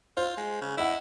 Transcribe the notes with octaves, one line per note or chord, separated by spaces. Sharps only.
F4 C5
G#3
C#3
E4 D#5 F#5